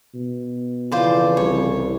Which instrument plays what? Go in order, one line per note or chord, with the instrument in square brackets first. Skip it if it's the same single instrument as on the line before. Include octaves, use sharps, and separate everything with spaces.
[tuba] B2
[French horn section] F2 C#3 E3 [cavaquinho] F4 C5 D5
[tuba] C2 [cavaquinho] C#5